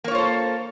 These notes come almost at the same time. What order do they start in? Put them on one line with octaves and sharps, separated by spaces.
A#3 C#5 F4 C5 A4